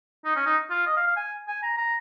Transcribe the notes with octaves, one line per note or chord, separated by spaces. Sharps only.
D#4
C#4
D#4
F4
D#5
F5
F5
G#5
G#5
A#5
A#5